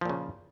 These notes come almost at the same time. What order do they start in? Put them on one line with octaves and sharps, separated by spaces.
F3 A#2 C#3